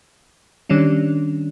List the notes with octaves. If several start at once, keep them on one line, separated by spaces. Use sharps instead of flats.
D#3 G3 C#4 D4